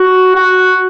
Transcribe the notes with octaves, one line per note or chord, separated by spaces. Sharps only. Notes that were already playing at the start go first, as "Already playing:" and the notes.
Already playing: F#4
F#4